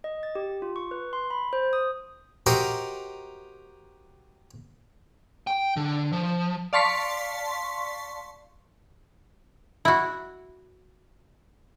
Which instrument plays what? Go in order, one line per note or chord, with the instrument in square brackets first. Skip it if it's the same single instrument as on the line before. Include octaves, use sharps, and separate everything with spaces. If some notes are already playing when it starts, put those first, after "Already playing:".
[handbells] D#5
A6
G4
F4
C#6
B4
C6
B5
C5
D#6
[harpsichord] D#4 F#4 G4 A#4 C5 D#5
[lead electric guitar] G5
D3
F3
[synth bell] D5 F5 A5 C6 C#6 B6
[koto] E4 F#4